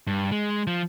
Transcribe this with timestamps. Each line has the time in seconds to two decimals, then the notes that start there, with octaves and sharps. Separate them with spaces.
0.07 G2
0.32 G#3
0.67 F3